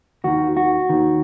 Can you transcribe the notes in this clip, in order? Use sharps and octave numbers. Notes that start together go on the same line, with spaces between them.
D#2 D#3 F#4
F#4
D#2 D#3